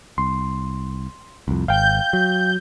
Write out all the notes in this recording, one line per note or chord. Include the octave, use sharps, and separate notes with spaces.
C2 C6
C2 F2
G#1 F5 G5 G6
F#3